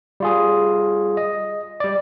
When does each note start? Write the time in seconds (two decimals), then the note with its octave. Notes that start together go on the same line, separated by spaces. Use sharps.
0.20 G3 F4 G#4
1.17 D#5
1.80 G3 D5